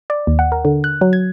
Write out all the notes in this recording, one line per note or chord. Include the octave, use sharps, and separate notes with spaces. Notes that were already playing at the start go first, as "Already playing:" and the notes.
D5
D#2
F#5
A#4
D3
F#6
F#3
G#6